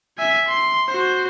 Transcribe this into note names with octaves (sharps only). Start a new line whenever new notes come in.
E5 G#5
C6
F#4 C5